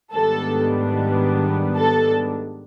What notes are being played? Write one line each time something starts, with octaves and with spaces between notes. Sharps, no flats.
G#2 D#3 G3 B3 D4 A4
A4